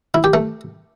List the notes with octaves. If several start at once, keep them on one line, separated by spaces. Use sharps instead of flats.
E4
G4
A3